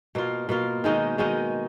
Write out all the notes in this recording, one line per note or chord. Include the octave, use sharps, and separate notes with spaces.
B2 A#3 F4
B2 A#3 F4
D#3 G#3 D#4 F#4
D#3 G#3 D#4 F#4